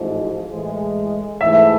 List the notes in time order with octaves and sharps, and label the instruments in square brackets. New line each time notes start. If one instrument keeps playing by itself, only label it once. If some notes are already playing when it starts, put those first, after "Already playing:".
Already playing: [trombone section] A1 G#2 F3
A2 E3 G#3
[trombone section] G#2 E3 A3 [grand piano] E5